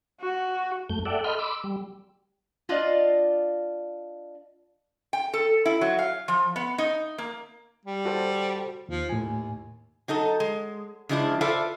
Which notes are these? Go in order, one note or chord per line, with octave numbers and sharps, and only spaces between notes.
F#4
F#2 A3 G6
A4 D5 E5 F#5 G5
A4 D#5 B5 C6 F6 G6
B5 C6 D6 E6
G3
D4 F4 D5 D#5 F5
G5
A4
E4
F#3
F5
F3
B3
D#4
A#3
G3
F#4 A4 C5
D#2 F3
D#2 A2 G#5
F#3 D#4 A4 D#5
G#3
C#3 F3 G#3 D4 E4 F4
F4 A4 B4 C5 D5 E5